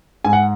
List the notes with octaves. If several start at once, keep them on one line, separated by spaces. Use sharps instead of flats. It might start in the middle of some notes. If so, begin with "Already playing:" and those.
G#2 G#5
F#5